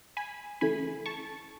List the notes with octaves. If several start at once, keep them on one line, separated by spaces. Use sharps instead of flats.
G#5 B5
C#3 E3 A3 G#5 B5
A5 C#6